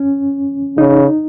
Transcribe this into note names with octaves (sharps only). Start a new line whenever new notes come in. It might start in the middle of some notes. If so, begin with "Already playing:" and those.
Already playing: C#4
C#3 D#4